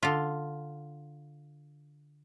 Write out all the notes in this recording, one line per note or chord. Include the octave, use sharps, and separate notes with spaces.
D3 F4